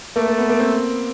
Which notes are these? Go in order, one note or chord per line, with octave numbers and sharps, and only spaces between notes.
A3 A#3
A#3
B3
A#3
C4